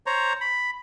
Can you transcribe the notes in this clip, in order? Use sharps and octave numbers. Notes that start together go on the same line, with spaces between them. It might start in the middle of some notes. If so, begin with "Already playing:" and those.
C5 C#5 A#5
B5